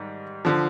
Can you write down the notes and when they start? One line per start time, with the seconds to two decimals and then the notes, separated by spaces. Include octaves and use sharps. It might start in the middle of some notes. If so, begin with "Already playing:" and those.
Already playing: G#2 D#3 G3
0.45 D3 F3